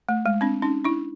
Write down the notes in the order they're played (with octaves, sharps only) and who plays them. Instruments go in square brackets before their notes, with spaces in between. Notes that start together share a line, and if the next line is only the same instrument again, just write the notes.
[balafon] A3
G#3
C4 D4
C#4 D#4
D4 E4